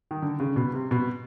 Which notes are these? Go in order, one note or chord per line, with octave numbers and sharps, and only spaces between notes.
D#3
D3
C#3
B2
C3
B2